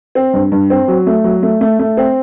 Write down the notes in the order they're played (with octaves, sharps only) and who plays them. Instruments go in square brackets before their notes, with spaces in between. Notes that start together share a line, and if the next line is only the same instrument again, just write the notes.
[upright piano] C4
G2
G2
C4
F#3
A3
F#3
A3
A3
A3
C4